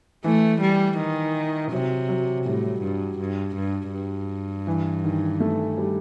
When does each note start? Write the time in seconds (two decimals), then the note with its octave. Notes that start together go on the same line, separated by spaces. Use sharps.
0.24 E3 A3
0.62 G3
0.98 D#3
1.72 C3 F#3
2.09 F#3
2.45 A2 G3
2.83 G2
3.19 G2
3.56 G2
3.94 G2
4.67 E3
5.04 D#3
5.40 A3
5.78 G3